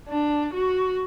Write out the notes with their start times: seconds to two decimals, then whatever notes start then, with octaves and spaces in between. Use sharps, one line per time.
0.08 D4
0.53 F#4